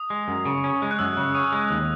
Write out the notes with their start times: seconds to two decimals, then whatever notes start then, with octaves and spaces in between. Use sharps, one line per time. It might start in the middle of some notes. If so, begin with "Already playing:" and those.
Already playing: D#6
0.10 G#3
0.28 F#2
0.45 C#3
0.64 C#4
0.82 G#3
0.91 F#6
0.99 F#2 E6
1.17 C#3
1.34 C#4 D#6
1.52 G#3
1.71 D#2